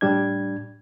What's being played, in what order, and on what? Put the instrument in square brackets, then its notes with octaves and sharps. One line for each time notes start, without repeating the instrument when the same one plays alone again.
[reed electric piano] A2 G3 D4 G#6